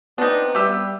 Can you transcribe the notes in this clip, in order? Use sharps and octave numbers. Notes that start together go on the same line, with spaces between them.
B3 C4 D4 D#4
G3 G4 E5